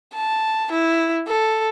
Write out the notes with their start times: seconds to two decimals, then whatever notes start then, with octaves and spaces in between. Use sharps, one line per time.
0.14 A5
0.72 E4
1.27 A4